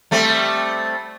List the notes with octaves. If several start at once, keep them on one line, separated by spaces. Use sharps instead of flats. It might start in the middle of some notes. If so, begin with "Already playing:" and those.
G3 A3 C4